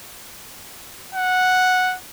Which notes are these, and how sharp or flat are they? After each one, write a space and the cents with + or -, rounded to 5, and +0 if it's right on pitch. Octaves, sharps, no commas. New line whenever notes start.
F#5 -5